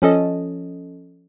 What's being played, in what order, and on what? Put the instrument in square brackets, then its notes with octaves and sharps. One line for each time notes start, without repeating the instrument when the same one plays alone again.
[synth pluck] F3 C#4 A4 D#5